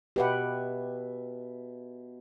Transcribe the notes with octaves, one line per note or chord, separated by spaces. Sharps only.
B2 G4 B4 E5 F#5